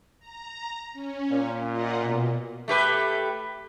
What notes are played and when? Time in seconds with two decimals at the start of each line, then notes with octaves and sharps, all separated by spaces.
0.19 A#5
0.93 C#4
1.29 A#2
1.69 F4 D#5 F#5
2.00 B2
2.68 A3 G4 B4